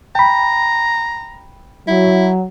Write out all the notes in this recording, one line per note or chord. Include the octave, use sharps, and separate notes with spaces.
G5 A#5 B5
F#3 E4